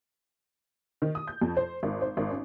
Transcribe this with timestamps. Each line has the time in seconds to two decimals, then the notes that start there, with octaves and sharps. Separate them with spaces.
1.02 D#3
1.15 D#6
1.27 G6
1.42 F2
1.57 C5
1.83 G#1
2.02 C5
2.17 G#1
2.30 C#4